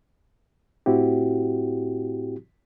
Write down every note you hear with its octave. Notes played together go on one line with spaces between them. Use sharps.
A2 C4 E4 F#4 G4